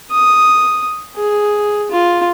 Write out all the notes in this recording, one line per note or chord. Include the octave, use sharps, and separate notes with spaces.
D#6
G#4
F4